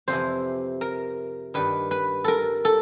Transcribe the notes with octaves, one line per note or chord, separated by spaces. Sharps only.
F2 C3 E3 C5
A#4
G2 D#3 B4
B4
A4 A#4
A4